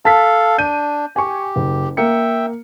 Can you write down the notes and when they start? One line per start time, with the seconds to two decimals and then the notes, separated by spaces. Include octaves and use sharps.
0.05 A4 F5 A5 B6
0.58 D4 G6 D#7
1.16 G4 G#5 C#6
1.56 F#1
1.97 A#3 E5 G5 C#7